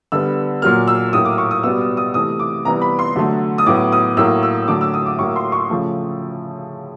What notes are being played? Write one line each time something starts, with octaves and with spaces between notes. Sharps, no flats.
D3 G3 B3 E6
A#2 F#3 A#3 F6
E6
A2 F#3 A#3 D#6
D6
C#6
D#6
B2 G3 B3 E6
D#6
D#6
C3 E3 A3 D#6
D6
C3 E3 G3 B3 A#5
B5
C6
D3 F#3 A3
D#6
A2 F#3 B3 D6
D#6
A2 F#3 A#3 E6
E6
D3 F#3 A3 D6
E6
D#6
D6
A2 F#3 A#3 C#6
C6
C#6
C#3 F3 A3